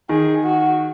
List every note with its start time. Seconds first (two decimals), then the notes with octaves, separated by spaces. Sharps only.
0.09 D#3 G#4
0.45 F#4